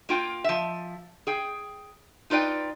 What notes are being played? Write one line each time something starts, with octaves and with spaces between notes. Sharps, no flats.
A#3 F4 G5
F3 E5
G#4 G5
D#4 F4 B4 D5 G5